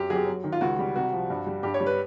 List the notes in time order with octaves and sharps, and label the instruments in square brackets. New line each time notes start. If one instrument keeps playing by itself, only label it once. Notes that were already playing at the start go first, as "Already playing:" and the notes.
Already playing: [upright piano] F#2 G4
F#3 G#4
G4
F#3
D#3
F4
C#2 F#4
G3
C2 F#4
F3
G2
G3
G2 G4
C#5
G3
B4